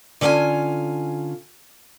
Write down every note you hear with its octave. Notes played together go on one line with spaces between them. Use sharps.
D3 C#4 F4 F#5 G#5